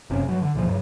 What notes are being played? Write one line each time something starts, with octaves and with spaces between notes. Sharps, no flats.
F#1 C3 C#4
G2 F#3
D3
C#2 A#2 E3 F3
G2 C#3 F#3